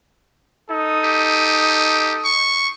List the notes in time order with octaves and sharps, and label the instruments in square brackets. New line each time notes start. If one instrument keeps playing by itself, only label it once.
[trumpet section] D#4 A4 D#6
[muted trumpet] G4
C#6